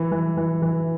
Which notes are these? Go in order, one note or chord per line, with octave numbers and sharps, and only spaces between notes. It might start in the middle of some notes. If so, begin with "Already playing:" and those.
Already playing: E3
E3
E3
E3